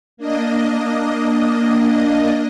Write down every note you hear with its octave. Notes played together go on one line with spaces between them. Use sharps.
A#3 D4 D#5